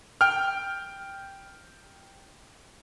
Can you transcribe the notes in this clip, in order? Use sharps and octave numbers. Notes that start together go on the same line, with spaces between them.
G5 F6